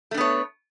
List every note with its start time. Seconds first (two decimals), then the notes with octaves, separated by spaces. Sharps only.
0.11 A3
0.14 D4
0.17 B3
0.21 C#5